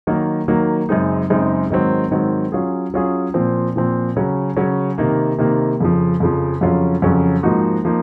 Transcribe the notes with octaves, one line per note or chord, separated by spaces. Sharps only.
D#3 F#3 A#3
D#3 F#3 A#3
F#2 C#3 G#3 C4 D#4
F#2 C#3 G#3 C4 D#4
G#2 D#3 F#3 C4
G#2 D#3 F#3 C4
F#3 C#4 F4 G#4
F#3 C#4 F4 G#4
A#2 F3 C4
A#2 F3 C4
C#3 F#3 C#4
C#3 F#3 C#4
C3 D#3 A#3
C3 D#3 A#3
F2 C#3 F3
F2 C#3 F3
F2 C#3 F#3 C#4 F4
F2 C#3 F#3 C#4 F4
G#2 F3 A#3 D#4 F#4
F3 A#3 D#4